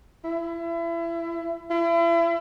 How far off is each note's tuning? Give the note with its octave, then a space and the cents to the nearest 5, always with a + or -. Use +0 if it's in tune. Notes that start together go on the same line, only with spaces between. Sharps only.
E4 +30
E4 +35